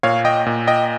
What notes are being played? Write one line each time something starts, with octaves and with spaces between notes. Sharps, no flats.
A#2 C#5 F5
D#5 G5
A#2
D#5 G5